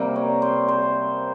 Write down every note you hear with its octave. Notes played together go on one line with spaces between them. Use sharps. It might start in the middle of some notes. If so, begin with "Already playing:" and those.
Already playing: C3 G3 A#3
C#5
C5
C5